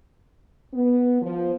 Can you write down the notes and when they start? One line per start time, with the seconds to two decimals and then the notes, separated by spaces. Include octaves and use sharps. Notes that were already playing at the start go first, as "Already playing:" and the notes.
0.73 B3
1.22 F3